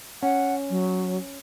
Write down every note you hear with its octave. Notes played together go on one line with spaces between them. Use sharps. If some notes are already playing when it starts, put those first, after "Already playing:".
C#4 F#5
F#3